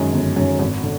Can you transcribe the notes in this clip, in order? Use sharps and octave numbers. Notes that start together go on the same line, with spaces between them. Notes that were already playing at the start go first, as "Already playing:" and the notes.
Already playing: F#2 D#3 G#3 C#4
G1
F#2 D#3 G#3 C#4
G#1
D3